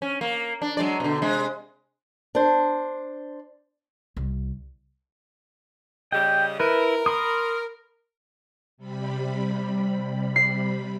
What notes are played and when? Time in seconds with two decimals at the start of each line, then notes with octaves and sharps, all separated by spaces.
0.02 C#4
0.21 A#3
0.62 D4
0.77 F#3 G#3 D5
1.00 B2 D3
1.22 C3 G#3
2.35 D4 C5
4.17 C2
6.12 C#3 G3 D#5 G5
6.60 E4 A#4 B4
7.06 B5 C6 D#6
8.77 C3 G3 B5
10.36 C7